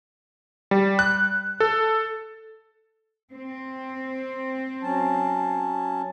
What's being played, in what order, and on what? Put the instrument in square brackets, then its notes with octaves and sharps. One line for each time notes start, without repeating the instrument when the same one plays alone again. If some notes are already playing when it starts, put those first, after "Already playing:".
[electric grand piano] G3
F#6
A4
[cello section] C4
[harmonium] F#3 C#4 A5